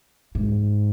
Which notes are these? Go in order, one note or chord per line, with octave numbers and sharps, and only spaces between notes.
G#2